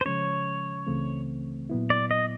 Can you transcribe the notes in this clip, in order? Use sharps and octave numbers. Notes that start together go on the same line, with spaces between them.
C5
C#3 F3 G#3 C#4 C#5
C#2 C#3 E3 A3 C4
A#2 F#3 B3 E4
D5
D#5